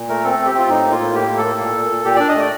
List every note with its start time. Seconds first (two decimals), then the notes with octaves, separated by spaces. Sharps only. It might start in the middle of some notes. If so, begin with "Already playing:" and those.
Already playing: A#2
0.09 A3 A#4
0.23 C4 A4
0.39 C4
0.46 G4
0.54 C4 F4
0.68 A2 D#4
0.84 A#3
0.92 F4
1.00 A2
1.15 A#3 G4
1.29 A2
1.37 A4
1.45 A#3
1.60 A#2
1.75 A#2
1.90 A#2
2.05 A#2 G4
2.16 D4 D5
2.29 D#5
2.35 A3 D5